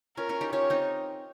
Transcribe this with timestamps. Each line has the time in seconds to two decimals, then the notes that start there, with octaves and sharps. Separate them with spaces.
0.17 C#4 F4 A#4
0.29 C#4 F4
0.41 D#4 G4
0.52 C#4 F4 C#5
0.70 C4 D#4